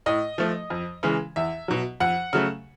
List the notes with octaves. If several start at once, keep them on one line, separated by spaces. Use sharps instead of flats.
A2 D#5
F3 A3
F2
C#3 E3 G#3
E2 E5
B2 F#3
F2 F#5
C#3 F#3 A3